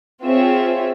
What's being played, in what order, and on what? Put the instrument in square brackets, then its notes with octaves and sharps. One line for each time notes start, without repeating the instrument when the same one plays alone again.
[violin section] C4 F4 G#4 C#5 E5